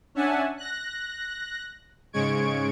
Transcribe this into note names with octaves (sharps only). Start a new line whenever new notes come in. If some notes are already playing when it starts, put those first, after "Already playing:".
C#4 D4 E5 F#5 G#5 A5
F#6 A#6
G#2 C#3 G#3 C#6 G#6 D7